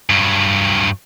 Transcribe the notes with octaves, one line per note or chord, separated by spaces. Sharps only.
G2 F#3